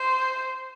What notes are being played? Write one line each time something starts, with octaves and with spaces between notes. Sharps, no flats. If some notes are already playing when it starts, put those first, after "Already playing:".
Already playing: C5